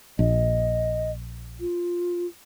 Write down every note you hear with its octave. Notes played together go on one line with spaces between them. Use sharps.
A#1 D#5
F4